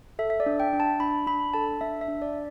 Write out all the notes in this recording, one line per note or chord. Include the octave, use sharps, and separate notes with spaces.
A4 E5
E5
D5
D4
G5
D4
A5
D4 B5
D4 B5
A4 A5
D4 E5
E5
D4
D5